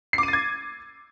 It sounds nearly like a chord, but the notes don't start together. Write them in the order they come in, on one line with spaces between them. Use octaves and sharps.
C7 D6 D#7 A6 G#6